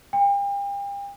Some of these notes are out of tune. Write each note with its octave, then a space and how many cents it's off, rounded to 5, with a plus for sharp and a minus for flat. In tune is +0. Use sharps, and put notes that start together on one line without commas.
G5 +40